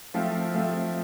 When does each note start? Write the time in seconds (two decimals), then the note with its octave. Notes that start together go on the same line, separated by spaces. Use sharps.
0.14 F3 A3 C4 F4
0.54 F3 A3 C4 F4